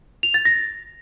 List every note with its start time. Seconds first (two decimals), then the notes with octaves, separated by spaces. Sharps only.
0.23 F7
0.34 A6
0.45 A#6